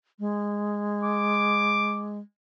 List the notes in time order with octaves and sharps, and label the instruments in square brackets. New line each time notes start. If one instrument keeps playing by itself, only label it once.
[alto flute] G#3
[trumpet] D6